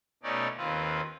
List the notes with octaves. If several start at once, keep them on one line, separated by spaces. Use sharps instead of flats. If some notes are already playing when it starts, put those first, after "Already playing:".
B2 A3 C#4 D#4 D5
D#2 C4 F4 B4